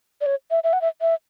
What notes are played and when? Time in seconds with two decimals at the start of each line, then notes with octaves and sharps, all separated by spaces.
0.21 D5
0.26 C#5
0.51 E5
0.64 E5
0.73 F#5
0.82 E5
1.01 E5